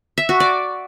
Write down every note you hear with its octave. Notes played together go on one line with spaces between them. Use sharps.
E5
F#4
D5